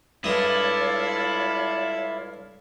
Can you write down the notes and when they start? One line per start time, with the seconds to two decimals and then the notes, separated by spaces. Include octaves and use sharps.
0.24 G2 G#3 E4 F4 A4 C#5 D5 D#6